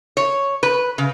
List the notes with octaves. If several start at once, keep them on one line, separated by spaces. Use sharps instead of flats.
C#5
B4
C#3